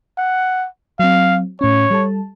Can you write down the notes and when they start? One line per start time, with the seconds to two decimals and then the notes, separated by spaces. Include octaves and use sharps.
0.18 F#5
0.99 F#3 C4 F5
1.61 A2 C#4 C#5
1.91 G3 A4 A5